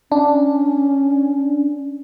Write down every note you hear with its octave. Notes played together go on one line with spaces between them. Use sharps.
C#4 D4